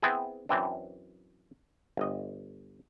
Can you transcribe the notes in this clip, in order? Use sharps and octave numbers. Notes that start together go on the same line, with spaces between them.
B3 C4 E4 G#4
F#2 E3 C4 D4
G1 D#5